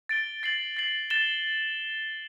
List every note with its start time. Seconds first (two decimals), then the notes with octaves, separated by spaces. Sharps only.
0.09 A6 D7 G7
0.43 A6 C7 F#7
0.77 A6 C7 F#7
1.10 A6 E7 G7